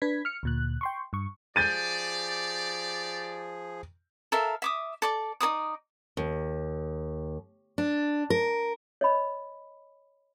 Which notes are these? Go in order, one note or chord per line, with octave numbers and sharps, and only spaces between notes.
D4 B4 G#6 B6
F6 C#7
D2 A#2 F#6
G5 C6 C#6
G2 C#6
F3 G4 G#4 D5 G6 A6 D#7
A4 A#4 E5 F5
E5 D6 D#6
A4 D5 D6
D#4 A#4 D5 D#6
D#2
D4
A#4
C#5 D#5 B5